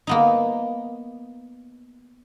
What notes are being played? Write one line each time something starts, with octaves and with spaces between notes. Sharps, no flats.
A#3 B3 D#4